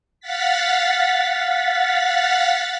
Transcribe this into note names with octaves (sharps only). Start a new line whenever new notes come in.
F5 F#5 A6 B6